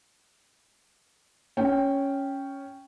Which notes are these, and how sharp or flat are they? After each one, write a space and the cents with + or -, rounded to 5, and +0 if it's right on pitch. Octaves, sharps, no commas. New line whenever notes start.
C#4 +0 G5 +0